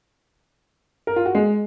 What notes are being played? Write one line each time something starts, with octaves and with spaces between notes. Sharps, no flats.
A#4
F4
F#4
G#3